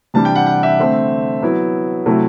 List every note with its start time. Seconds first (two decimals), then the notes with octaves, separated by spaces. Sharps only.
0.14 C3 E3 G3 D4 A5
0.25 G5
0.35 F#5
0.46 F#5
0.63 E5
0.79 D3 A3 C4
1.42 F#3 B3 E4
2.06 C3 F#3 A3 E4